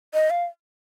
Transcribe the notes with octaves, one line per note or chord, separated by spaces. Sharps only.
D#5
F5